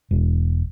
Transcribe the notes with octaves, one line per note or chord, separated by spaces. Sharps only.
E1